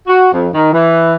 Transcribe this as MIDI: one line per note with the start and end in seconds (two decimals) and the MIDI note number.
0.07 0.28 66
0.32 0.48 41
0.53 0.70 51
0.72 1.15 52